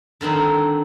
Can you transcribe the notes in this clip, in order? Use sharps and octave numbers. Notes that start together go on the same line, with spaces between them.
D3 D#3 C4 D#4